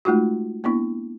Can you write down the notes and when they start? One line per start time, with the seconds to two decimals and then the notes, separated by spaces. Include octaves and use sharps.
0.05 G#3 A3 D#4 F4 F#4
0.64 A#3 B3 D4 E4